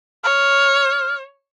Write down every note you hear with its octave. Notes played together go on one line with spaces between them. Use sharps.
C#5 F6